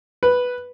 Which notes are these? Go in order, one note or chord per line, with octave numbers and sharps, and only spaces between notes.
B4